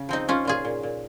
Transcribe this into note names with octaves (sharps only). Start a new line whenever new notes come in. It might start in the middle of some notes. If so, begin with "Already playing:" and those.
Already playing: C#3
F3 C4 D#4
C#3 C#4 F4
A#2 F4 G#4
A#2
A#2